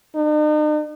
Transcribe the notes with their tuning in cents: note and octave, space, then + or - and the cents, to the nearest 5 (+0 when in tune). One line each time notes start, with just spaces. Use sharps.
D#4 -45